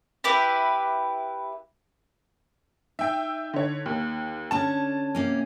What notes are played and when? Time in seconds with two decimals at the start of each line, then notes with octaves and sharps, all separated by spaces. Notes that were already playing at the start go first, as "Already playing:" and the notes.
0.24 E4 G4 B4
2.99 D#4 E5 G5
3.54 D3 C#5
3.86 D#2
4.51 D3 C#4 D4 A5
5.15 C3 A#3 C#4